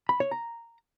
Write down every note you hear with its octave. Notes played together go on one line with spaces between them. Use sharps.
B5
C#5
A#5